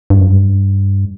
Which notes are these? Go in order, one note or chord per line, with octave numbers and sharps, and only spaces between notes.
G2
F#2
G2